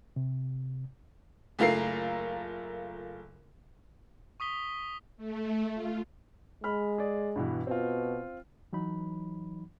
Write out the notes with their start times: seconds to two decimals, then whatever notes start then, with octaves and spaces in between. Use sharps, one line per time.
0.16 C3
1.59 F#1 A3 F4 A#4 C7
4.40 C#6 D#6 B6 G7
5.17 A3
5.74 F4
6.64 G#3 B5 F6
6.98 G#4 D5
7.36 G2 B2 E3
7.67 B2 C4 F4
8.73 E3 F#3 D#4 B5